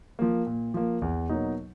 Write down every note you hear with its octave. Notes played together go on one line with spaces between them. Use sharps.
F3 A#3
A#2
F3 A#3
E2
B2 F#3 A#3 D#4